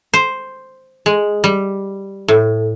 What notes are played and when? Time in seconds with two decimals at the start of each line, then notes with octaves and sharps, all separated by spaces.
0.14 C5
1.06 G#3
1.44 G3
2.28 A2